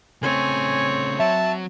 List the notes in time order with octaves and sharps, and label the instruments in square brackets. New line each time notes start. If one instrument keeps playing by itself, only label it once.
[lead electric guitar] C#3 A3 [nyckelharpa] C4 C#5 [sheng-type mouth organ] G#5
[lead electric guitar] F#3 [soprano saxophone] E5 [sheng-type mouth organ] A5